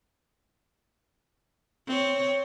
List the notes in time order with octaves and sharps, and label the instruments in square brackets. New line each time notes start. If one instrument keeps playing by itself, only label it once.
[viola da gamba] C4 C#5